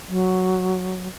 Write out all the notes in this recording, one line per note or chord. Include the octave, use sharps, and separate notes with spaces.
F#3